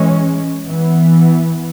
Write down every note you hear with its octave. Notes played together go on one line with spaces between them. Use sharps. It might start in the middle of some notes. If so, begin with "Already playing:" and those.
Already playing: E3 G#3 C#4
E3 B3